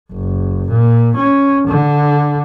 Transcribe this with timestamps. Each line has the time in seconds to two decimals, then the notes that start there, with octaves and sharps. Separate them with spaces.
0.12 F#1
0.69 A#2
1.16 C#4
1.67 D3